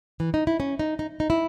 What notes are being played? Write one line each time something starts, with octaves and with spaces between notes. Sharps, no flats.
E3
D#4
E4
C#4
D#4
D#4
D#4
E4